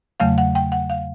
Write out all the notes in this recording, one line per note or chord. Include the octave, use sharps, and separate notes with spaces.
E2 C#3 F#3 A3 F5
F#5
G5
F#5
F5